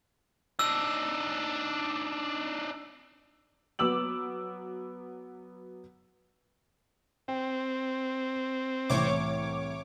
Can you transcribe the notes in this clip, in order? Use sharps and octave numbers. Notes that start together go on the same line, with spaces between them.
D4 D#4 E6
F#3 B3 D6 E6 F#7
C4 G5
C2 A2 E3 C#5 D6